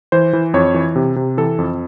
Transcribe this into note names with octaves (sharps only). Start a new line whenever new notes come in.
E3 C5
E3
F2 C#5
E3
C3
C3
E3 A4
F2